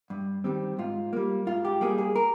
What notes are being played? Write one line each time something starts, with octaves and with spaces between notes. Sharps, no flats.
G2
D#3 G3 C4
G#2 F4
G3 A#3
G#2 F4
G4
G3 A#3 G#4
G#4
A#4